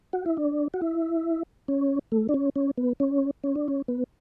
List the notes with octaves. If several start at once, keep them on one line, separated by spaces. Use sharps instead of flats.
F#4
E4
D4
F#4
E4
C#4
A3
D4
C#4
C#4
B3
C#4
C#4
D4
C#4
B3